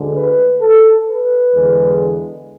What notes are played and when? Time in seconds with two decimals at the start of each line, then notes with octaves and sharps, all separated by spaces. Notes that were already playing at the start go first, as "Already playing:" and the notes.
Already playing: D2 D3 G#3
0.15 B4
0.62 A4
1.09 B4
1.56 E2 D3 G#3